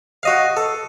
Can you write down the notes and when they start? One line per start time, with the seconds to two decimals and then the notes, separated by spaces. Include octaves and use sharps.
0.23 F#4 D#5 F5
0.57 A4